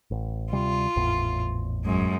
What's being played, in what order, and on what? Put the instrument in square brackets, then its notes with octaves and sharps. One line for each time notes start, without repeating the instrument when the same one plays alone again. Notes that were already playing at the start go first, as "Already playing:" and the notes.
[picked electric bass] A1
[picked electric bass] D2 C3 G3 [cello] F4
[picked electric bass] G#1 E2 A2
[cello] F#2 G#3